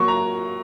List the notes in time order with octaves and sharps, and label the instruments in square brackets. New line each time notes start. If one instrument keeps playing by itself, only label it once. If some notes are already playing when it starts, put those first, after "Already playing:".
Already playing: [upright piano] F#3 A#3 C#6
A#5